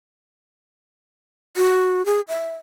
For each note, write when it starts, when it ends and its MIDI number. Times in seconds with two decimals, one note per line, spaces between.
1.57 2.05 66
2.06 2.21 68
2.28 2.55 76